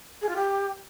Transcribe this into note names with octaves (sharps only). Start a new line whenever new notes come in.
G#4
F4
G4